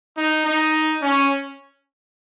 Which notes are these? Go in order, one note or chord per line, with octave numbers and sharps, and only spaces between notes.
D#4
D#4
C#4